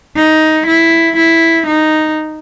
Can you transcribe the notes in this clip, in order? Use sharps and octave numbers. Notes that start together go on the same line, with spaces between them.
D#4
E4
E4
D#4